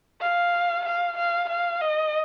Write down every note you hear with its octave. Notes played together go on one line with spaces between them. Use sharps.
F5
F5
F5
F5
D#5